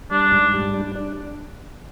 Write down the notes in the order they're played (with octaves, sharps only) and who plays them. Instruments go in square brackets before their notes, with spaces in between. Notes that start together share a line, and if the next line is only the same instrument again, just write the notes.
[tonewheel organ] G3 [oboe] D4
[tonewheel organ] G#2
G3
D4
D4